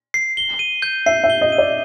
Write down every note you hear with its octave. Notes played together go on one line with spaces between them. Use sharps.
C7
G7
D#7
G6
E5 C7
E5
G7
D#5
D#7
D5